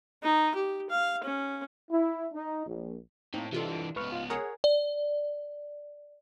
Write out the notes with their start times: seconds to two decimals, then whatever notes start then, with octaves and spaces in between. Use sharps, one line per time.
0.23 D#4
0.55 G4
0.90 F5
1.24 C#4
1.91 E4
2.33 D#4
2.66 A#1
3.34 A2 A#3 C4 D#4
3.53 C3 E3 D4 F4 A4
3.96 C#2 B3 B4 C#6 F6
4.12 F4 F5
4.30 G#4 A#4 C#5 F#5 G#5
4.64 D5